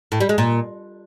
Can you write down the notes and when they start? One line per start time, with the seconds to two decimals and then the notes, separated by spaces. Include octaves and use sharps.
0.12 A2
0.20 G3
0.29 G#3
0.38 A#2